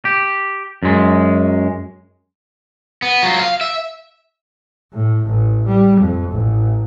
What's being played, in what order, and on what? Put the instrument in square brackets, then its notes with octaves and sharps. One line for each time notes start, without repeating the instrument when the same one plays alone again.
[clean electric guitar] G4
F#2 G#3
[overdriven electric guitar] B3
F#3 F4
F5
E5
[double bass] A2
A1
G3
F2
A1